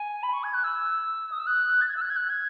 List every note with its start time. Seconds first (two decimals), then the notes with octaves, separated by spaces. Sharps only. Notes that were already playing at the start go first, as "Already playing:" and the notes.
Already playing: G#5
0.23 B5
0.33 C#6
0.44 G#6
0.54 F#6
0.64 E6
1.32 D#6
1.39 E6
1.47 F#6
1.81 A6
1.88 G#6
1.97 E6
2.01 F#6
2.10 G#6
2.16 F#6
2.29 G#6